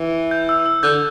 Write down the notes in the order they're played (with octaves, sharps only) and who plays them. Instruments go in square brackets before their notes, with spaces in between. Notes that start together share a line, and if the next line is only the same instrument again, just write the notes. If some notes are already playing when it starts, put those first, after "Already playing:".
Already playing: [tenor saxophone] E3
[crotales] G6
E6
E6
[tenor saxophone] D3 [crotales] G6